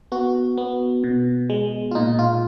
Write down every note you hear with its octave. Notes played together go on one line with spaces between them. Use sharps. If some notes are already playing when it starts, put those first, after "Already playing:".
B3 F#4
B3
B2
G#3
F4
A#2 D#4
F4